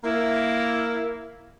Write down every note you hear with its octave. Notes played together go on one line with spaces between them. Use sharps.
A#3 E4